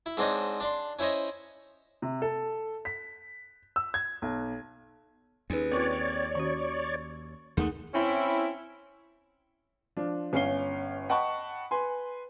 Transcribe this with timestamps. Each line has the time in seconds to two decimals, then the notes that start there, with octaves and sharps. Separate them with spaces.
0.06 E4
0.17 G#2 C4 D4 C5 C#5 D#5
0.60 D4 D5 C6
0.99 C#4 E4 C5 C#5 D#5
2.02 C3
2.22 A4
2.85 B6
3.76 E6
3.94 G#6
4.22 B1
5.50 D#2 C#4 D#4 G#4 B4
5.72 C4 F4 A#4 C#5 D5 C#6 A6
6.35 D#3 C#4 F#4 C#6
7.57 D#2 A3 D#4 G#4 A#4 F#5 D#6
7.94 C4 C#4 E4
9.97 F3 D4 F4
10.33 G1 C#4 F5 C7 G7
11.09 D#5 F#5 G5 A5 B5 C#6
11.71 B4 G#5 C6